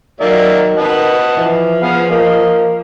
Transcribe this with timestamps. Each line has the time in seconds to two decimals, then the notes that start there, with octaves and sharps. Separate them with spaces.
0.21 D#3 F#3 A#3 D5 E5
0.77 B4 D#5 F#5 A5
1.37 E3 F3
1.82 B3 G#4 F5
2.11 A#3 D#5